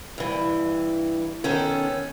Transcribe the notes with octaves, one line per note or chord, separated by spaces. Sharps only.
G2 E3
D#3 B3 C#4 A4